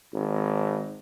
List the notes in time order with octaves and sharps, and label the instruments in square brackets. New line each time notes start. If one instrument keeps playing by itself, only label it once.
[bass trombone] G#1